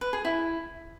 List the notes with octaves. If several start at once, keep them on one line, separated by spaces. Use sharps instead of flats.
B4
G#4
E4